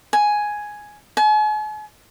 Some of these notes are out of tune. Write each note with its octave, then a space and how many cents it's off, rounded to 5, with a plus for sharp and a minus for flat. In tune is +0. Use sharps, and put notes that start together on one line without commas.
G#5 +5
G#5 +45